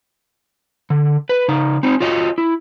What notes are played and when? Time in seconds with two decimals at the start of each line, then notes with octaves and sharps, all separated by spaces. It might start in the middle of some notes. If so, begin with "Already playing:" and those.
0.90 D3
1.29 B4
1.48 C#3 D#4
1.83 C4 D#4
2.00 F4 F#4 C#5 D#5
2.38 E4